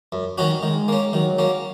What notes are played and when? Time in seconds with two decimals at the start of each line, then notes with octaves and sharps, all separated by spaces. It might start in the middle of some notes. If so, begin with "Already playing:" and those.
0.12 F#2
0.38 D#3 F#3 C#4 F#4
0.63 D#3 G#3
0.88 A#3 C#4
1.13 D#3 F#3
1.38 A#3 C#4